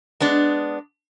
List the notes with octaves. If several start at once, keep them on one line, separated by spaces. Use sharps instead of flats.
G#3 B3 D4